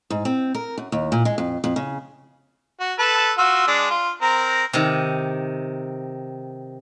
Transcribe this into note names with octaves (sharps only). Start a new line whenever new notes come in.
G#2
C4
A#4
F#2
D#2
A#2
G#3
F2
F2
C#3
F#4
A4 B4 A5
F4 F#4 E6
G#3 D4
F4
C4 A#4 A#5
C3 D#3